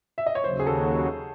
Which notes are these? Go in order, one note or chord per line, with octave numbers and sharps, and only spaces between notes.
E5
D#5
C#5
D#2 C#3 F#3 C5
G#4
A4